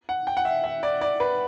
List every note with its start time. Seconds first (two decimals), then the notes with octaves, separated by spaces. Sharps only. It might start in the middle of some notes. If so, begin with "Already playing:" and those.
0.09 F#5
0.27 G5
0.37 F#5
0.45 E5
0.64 E5
0.83 D5
1.01 D5
1.20 B4